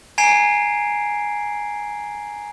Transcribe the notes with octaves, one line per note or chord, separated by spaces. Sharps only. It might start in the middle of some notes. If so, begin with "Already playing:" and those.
G#5 A#5 G#6 C7 D7